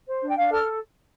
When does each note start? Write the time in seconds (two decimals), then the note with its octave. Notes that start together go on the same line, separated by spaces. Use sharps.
0.08 C5
0.23 D4
0.29 G5
0.38 D4 F5
0.52 A4 F6